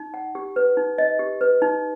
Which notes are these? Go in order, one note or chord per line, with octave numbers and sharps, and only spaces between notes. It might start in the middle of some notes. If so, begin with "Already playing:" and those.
Already playing: D#4
F#5
G4
B4
D#4
D#5
G4
B4
D#4